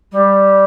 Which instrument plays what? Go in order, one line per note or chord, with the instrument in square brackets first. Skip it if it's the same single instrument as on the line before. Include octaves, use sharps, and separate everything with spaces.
[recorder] G3